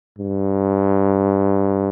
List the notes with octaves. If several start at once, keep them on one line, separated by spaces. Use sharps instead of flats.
G2